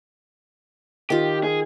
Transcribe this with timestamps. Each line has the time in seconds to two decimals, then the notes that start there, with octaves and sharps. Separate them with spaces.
1.10 D#3 F4 G4
1.44 G#4